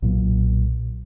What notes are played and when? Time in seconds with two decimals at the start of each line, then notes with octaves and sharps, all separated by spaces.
0.02 B1 A#2 F#3